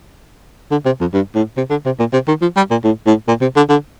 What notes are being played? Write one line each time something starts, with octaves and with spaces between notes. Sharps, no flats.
D3
C3
F2
G2
A2
C3
D3
C3
A#2
C3
D#3
F3
G3
A#2
A2
A2
A#2
C3
D3
D3